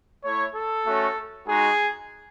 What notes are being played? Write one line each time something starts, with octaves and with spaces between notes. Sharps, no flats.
A3 E4 C#5
A4
A3 C#4 F#4
G#3 D#4 F#4 G#4